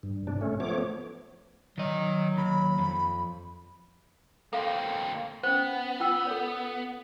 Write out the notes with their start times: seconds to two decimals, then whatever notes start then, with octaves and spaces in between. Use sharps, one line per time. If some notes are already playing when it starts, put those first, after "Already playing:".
0.03 G2
0.27 G#2 C3 D4
0.41 A3 C#4
0.60 F3 A3 B3 C#5 D6
1.78 D#3 F#3 D#5
2.38 D#2 B5
2.79 F2
4.53 A#3 C4 A4 F5
5.43 B3 C#4 C5
6.00 F4 G5 E6
6.27 A4 C#5